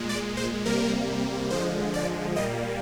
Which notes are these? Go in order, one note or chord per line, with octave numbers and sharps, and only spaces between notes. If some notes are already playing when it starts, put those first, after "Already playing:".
Already playing: A#2 G#3
D5
C5
C3 G3 A#3 A#4
D3 F3 G#3 C5
D5
A#2 G3 A#3 D#5